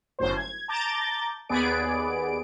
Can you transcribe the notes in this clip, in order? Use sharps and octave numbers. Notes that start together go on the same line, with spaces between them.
G1 F#2 A2 C5
G#6
A5 A#5 D6 G6 A6
D#2 B3 G#4 B4 D5 D7